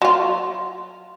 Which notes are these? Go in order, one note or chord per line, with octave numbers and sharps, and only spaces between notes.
F#3 F4